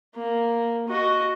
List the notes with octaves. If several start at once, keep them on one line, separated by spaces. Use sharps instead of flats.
A#3
F#4 D#5